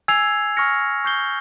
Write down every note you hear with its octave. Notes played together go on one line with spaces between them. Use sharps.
G#5 E6 G#6 C7 F7
G#5 C#6 F6 A#6 C#7
C#6 G6 C7 G7